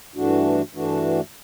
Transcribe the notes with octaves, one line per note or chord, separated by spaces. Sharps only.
G2 E3 A3 D4 F#4
G2 E3 A3 D4 F#4